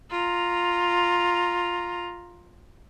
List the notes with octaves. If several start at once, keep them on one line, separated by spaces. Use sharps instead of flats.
F4 A#5